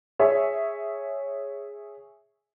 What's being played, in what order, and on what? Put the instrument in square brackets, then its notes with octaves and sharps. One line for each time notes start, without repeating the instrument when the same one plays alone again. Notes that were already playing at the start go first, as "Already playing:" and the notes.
[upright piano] G#4 C#5 E5